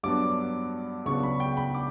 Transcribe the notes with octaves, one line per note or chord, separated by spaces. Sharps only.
G2 F#3 B3 D4 D6
C#2 C#3 F#3 B3 D4 C#6
B5
G5
B5
D6